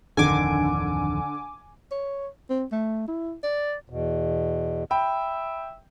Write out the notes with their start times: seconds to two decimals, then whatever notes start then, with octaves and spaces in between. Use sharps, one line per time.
0.17 D1 F2 D3 D#3 G#5 D6
1.91 C#5
2.50 C4
2.72 A3
3.08 E4
3.43 D5
3.90 E2 B2
4.91 E5 G5 B5